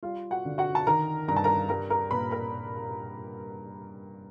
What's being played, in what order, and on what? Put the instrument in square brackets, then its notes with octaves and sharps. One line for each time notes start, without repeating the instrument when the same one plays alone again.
[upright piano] G3 F4 F5
F#4 F#5
D3
F#4 F#5
A5
D#3 A#4 A#5
G2 A#5
A5
A#4 A#5
G3 A#4 A#5
A#4 A#5
A#2 B4 B5
A#4 A#5